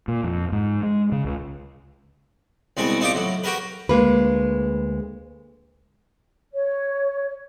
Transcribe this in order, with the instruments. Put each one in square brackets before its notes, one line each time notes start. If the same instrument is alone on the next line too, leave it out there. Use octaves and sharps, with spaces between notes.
[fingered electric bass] A#2
F2
G#2
G#3
C#3
C#2
[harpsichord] C2 B2 G3 G#3 C4
A#2 C4 D#4 F4 G4 D6
A2 F#3
F#4 G4 A#4 B4
[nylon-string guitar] D2 G#3 A#3 B4
[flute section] C#5